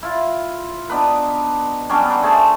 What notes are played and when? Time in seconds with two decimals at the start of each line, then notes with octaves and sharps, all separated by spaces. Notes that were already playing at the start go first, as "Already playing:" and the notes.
0.03 E4 F4
0.90 B3 D4 D#4 B4
1.89 F#3 G3 C#4 D4
2.05 F#3 B3
2.23 A3 G#4 C5 A5